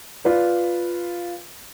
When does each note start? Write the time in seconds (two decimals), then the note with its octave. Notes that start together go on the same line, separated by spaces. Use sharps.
0.25 F4 B4 D5